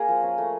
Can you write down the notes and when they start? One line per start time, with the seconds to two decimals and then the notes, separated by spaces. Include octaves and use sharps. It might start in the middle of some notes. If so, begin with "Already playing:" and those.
Already playing: A#3 G#4 A#4
0.08 F3
0.23 C#4
0.38 A3